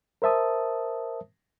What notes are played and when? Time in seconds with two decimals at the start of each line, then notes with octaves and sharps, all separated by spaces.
0.22 A#4 C5 E5 A5 D#6